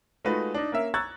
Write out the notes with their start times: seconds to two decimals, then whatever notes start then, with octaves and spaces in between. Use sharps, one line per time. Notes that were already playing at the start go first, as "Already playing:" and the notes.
0.25 G#3 A3 D#4 F4 F#4 B4
0.54 D4 D#4
0.72 A#3 C#4 A#4 E5
0.94 A#5 C#6 E6 F#6 G#6 A6